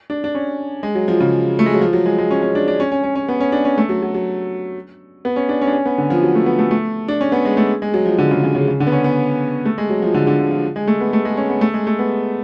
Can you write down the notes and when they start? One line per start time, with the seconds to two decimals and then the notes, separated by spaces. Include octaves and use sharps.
0.10 D4
0.24 D4
0.35 C#4
0.83 G#3
0.95 F#3
1.08 F3
1.20 C#3
1.59 A3
1.66 G#3
1.74 F#3
1.81 F3
1.93 F#3
2.06 G#3
2.18 G#3
2.31 C#4
2.42 C#4
2.55 D4
2.68 D4
2.80 C#4
2.92 C#4
3.03 C#4
3.15 C#4
3.29 B3
3.40 C#4
3.52 D4
3.65 C#4
3.78 A3
3.89 F#3
4.02 F#3
4.14 F#3
5.25 B3
5.36 C#4
5.49 D4
5.61 C#4
5.67 D4
5.73 C#4
5.86 B3
5.98 D3
6.10 F3
6.23 F#3
6.35 A3
6.46 B3
6.59 A3
6.71 A3
7.08 D4
7.21 C#4
7.32 B3
7.45 G#3
7.57 A3
7.82 G#3
7.94 F#3
8.06 F3
8.18 D3
8.31 C#3
8.43 C#3
8.55 C#3
8.68 C#3
8.80 D3
8.87 B3
8.92 C#4
9.04 B3
9.65 A3
9.78 G#3
9.90 F#3
10.02 F3
10.14 D3
10.27 D3
10.39 F3
10.51 F3
10.76 G#3
10.87 A3
11.01 B3
11.13 A3
11.25 G#3
11.37 C#4
11.49 B3
11.61 A3
11.74 G#3
11.87 A3
11.99 B3